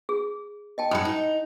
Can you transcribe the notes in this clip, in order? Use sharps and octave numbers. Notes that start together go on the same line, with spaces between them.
G#4
D#5 G5 A5
F#2 G#3 B5 D#6
D#4